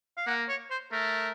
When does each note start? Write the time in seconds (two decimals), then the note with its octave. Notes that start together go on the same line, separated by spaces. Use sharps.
0.17 F5
0.27 A#3 F#5
0.49 C#5
0.71 C5
0.92 A3 A#4